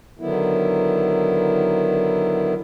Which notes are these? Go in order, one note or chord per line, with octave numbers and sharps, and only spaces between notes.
D3 D#3 F#3 B3 E4